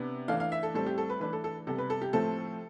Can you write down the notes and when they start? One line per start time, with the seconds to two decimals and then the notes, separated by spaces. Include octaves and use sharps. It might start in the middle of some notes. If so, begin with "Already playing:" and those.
Already playing: C3 B3 D4
0.28 E3 A3 D4 F5
0.40 F5
0.52 E5
0.63 A4
0.74 A2 G3 C4 A4
0.86 G4
0.98 A4
1.10 B4
1.20 E3 A3 D4 B4
1.33 A4
1.44 A4
1.67 C3 G3 B3 A4
1.78 B4
1.90 A4
2.02 G4
2.13 A2 F3 A3 C4 A4